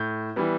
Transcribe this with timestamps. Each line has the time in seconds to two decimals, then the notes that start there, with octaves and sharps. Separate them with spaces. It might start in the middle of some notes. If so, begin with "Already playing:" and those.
Already playing: A2 G6
0.36 E3 G3 B3